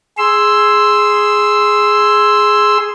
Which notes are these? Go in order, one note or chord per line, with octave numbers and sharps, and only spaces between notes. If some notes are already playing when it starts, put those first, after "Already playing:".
G#4 C6 E6